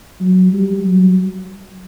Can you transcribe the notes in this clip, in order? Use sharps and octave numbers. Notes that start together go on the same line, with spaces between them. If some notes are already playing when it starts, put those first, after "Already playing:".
F#3
G3
F#3